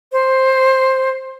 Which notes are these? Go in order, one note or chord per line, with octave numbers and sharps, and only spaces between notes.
C5